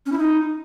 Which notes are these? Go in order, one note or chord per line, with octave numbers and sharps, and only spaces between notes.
C#4
E4
D#4